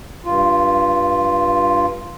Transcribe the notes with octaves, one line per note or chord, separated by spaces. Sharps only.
G2 F4